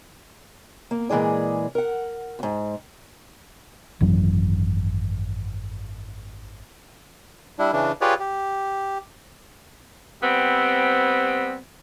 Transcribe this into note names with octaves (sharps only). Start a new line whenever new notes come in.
A#3
A#2 E3 G#3 G#4 D5
A#4 F#5
F2 G#2
G#1 F#2 E3 F#3
G3 D4 E4
C#3 E3 D4
F4 G4 G#4 B4 C#5 D5
G4
G3 B3 C4